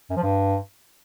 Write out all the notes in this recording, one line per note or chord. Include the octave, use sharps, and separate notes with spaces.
F#2
F3
G2